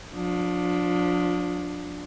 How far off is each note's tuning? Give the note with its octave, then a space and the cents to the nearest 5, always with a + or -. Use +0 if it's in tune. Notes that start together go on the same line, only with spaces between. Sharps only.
F3 +35 D4 +0